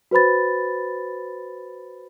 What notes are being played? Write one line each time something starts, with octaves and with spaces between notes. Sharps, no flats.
F#4 B4 C5 B5 A6